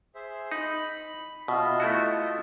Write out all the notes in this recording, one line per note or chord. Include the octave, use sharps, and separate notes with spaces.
G#4 C5 E5
D#4 B5
B2 F4 D#5 E5
A3 E4 F#4